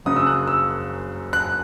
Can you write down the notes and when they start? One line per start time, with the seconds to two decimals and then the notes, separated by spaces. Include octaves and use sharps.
0.05 F#1 F#2 C#3 F#3 D#6
0.16 E6
0.27 F#6
0.47 E6
1.33 F#6